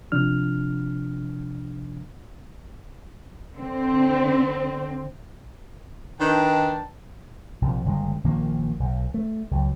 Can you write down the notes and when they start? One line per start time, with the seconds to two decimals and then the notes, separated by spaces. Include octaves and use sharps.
0.12 C3 F3 D4 F6
3.55 D3 C4
6.20 D#3 D4 D#4 B4 G5 A5
7.62 A#1 C3 F3
7.86 F#1 D3 G3 G#3
8.24 A#1 D#3 F3 A#3
8.80 B1
9.14 A3
9.51 C#2 F#3